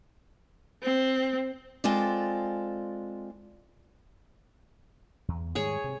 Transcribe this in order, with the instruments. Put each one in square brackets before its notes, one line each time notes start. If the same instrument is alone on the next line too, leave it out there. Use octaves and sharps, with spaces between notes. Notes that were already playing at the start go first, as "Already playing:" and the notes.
[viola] C4
[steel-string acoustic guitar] G#3 C4 F4 A4 D5
[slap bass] E2
[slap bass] G#2 D#3 G3 [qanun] G#4 C#5
[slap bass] C3